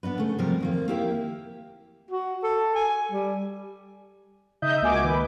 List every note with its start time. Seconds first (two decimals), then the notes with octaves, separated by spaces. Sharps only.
0.03 B3 D4 D#4 B4
0.18 C#3 A3
0.39 C3 F3 G3 A#4
0.60 F2 D#3 A#3
0.88 A#3 E4 G4 F5 G5
2.11 F#4
2.44 A4
2.75 G#5
3.12 G3
4.62 C#3 D#4 D#5 E5 G6
4.82 C#2 A#3 F#4 G#5 D6
5.04 D#3 B4